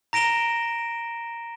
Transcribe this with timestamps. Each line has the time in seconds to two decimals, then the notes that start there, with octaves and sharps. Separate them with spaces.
0.13 A#5 A#6 D7 E7 G7